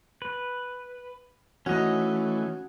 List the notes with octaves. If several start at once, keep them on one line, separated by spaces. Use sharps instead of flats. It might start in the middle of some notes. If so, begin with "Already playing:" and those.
B4
E3 A3 C#4 D#4 F#4 D#5